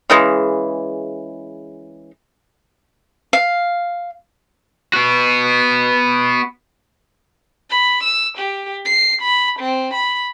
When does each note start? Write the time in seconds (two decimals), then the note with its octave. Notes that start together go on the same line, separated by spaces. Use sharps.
0.10 C#3 E3 G#3
3.33 F5
4.93 B3 F#4
7.70 B5
8.04 E6
8.38 G4
8.85 C7
9.22 B5
9.60 C4
9.94 B5